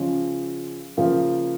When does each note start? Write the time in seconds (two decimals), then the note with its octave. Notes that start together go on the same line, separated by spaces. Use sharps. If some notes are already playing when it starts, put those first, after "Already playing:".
Already playing: C#3 F3 G#3 C#4
0.97 C#3 F3 A#3